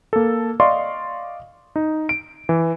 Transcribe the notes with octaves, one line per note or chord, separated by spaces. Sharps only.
A#3 A4
D5 D#5 F5 C6 C#6
D#4
D7
E3